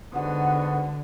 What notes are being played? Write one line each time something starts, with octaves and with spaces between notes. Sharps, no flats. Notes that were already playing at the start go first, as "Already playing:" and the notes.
G#2 D3 B3 F#4